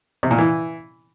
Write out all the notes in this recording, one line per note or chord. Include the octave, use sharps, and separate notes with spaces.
C3
A#2
E3